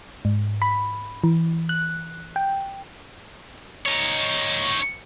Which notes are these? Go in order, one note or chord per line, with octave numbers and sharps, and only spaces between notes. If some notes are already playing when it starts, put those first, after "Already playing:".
G#2
B5
E3
F#6
G5
D#4 C#5